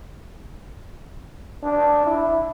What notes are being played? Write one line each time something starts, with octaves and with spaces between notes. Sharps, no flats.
D4
E4